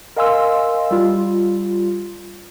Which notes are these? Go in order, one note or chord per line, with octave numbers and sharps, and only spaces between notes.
A#4 D#5 F5 G#5 C6 E6
G3 F4